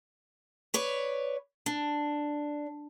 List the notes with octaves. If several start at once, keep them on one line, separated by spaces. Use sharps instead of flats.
B4 C#5 D5
D4